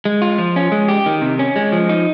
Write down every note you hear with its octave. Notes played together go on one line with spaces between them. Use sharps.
G#3
F4
F3
C#4
G#3
G4
D#3
C3
C#4
G#3
F3
D#4